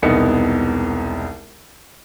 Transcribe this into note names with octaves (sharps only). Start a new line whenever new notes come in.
E1 C2 B3 D#4 C#7